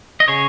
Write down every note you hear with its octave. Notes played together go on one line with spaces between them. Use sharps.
D#5
C#3 G#4 C#5